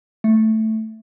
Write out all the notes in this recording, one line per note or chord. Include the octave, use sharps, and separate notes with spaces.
A3